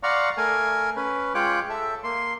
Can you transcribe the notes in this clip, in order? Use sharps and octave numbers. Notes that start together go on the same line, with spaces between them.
D5 F5 F#5 A#5 C6 C#6
A3 A#4 G#5
C#4 B4
G#3 F4 C#5 G5 D6 F#6
A4 E5
A#3 C6